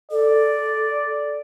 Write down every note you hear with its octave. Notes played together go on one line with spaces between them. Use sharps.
A4 D5